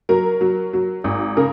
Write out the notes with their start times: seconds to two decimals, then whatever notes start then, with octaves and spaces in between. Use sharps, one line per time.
0.09 F#3 A#4
0.41 F#3
0.73 F#3
1.04 G#1
1.37 C#3 A#4